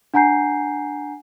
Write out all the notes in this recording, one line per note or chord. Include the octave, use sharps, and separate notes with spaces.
D4 F#5 G#5 A#5 G6 C7